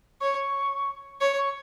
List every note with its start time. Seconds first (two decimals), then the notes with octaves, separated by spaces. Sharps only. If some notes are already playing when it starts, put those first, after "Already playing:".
0.21 C#5 C#6
1.21 C#5 C#6
1.38 C#6